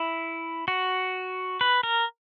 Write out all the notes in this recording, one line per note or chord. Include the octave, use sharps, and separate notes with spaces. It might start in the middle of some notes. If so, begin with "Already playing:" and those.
Already playing: E4
F#4
B4
A#4